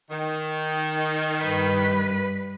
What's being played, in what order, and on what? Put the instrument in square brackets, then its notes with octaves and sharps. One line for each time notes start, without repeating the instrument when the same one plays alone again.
[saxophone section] D#3
[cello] G2 B4